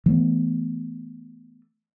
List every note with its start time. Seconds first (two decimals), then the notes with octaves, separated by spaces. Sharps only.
0.06 E3 A3 B3